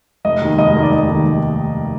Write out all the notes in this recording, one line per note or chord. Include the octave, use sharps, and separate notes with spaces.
F1 D#5
D#2 D#3
F1 D#5
D#2 D#3
D5
F1 D#5
D#2 D#3
F1